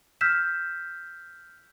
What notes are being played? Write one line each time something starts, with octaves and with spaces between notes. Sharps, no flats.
E6 F6 G6 B6 E7